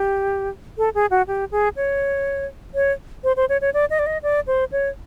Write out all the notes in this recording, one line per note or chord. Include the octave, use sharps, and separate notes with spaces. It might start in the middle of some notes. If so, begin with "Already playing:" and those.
Already playing: G4
A4
G#4
F#4
G4
G#4
C#5
C#5
C5
C5
C#5
C#5
D5
D#5
D5
D#5
D5
C5
C#5